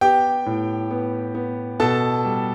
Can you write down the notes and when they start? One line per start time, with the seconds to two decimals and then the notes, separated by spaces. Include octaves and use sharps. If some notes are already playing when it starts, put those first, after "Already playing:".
0.01 B3 G4 G5
0.46 A2
0.91 B3
1.35 B3
1.80 B2 A4 A5
2.25 G3